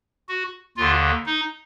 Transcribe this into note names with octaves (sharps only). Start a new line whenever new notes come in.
F#4
D#2 D3 F4
D#4